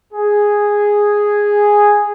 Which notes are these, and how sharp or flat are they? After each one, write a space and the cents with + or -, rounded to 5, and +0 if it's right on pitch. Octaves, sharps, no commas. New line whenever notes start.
G#4 -5